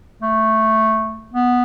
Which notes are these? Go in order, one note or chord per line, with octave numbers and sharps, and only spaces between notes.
A3
B3